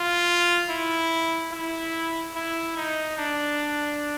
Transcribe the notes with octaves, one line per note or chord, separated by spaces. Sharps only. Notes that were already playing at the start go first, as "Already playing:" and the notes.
Already playing: F4
E4
E4
E4
D#4
D4